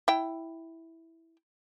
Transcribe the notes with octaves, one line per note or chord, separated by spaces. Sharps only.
E4 G5